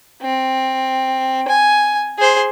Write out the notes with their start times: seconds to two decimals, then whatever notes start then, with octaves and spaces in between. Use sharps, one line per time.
0.22 C4
1.48 G#5
2.18 G#4 C5